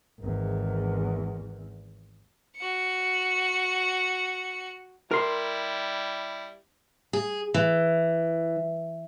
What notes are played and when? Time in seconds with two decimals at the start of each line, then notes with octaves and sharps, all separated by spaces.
0.20 G#1 E2
2.57 F#4 C#7
5.11 G3 E4 A#4 C6
7.13 G#4
7.54 E3